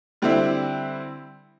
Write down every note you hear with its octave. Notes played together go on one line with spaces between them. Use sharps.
D3 G3 C4 E4